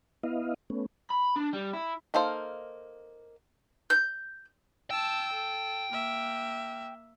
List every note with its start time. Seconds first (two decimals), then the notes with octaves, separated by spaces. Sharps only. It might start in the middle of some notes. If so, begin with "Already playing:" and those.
0.24 B3 E4 D#5 F5
0.70 A3 B3 C#4
1.10 B5
1.36 D4
1.53 G3
1.73 E4
2.14 A#3 D#4 A4 C5 F5
3.90 G6
4.91 G5 A5 E6
5.33 A4
5.93 A#3 E5